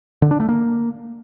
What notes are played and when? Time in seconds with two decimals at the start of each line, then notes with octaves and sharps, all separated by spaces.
0.22 D3
0.31 D4
0.40 A3
0.49 A#3